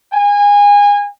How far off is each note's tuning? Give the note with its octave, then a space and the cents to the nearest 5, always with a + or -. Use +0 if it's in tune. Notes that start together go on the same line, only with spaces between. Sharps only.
G#5 -25